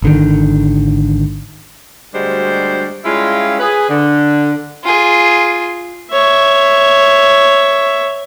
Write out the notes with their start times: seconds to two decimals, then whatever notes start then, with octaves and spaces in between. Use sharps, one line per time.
0.02 G#1 D3 D#3
2.14 D2 G3 G#3 D4 F#4 C5
3.05 G3 G#3 C#4 E4 F4
3.59 G#4 B4
3.89 D3
4.84 F4 G#4
6.11 C#5 E5